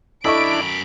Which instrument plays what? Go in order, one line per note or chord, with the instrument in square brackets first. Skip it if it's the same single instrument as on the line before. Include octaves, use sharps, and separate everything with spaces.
[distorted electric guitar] F#2 B5 [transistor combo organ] D4 E4 [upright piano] A4 D#5 C#6 [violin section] D7